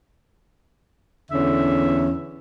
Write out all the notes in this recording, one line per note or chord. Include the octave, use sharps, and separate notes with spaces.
E2 D3 C#4 E5